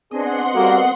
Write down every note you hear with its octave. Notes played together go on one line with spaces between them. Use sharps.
B3 C4 D4 G#4 D#5 F#5 C6
G3 A#3 F#4 A4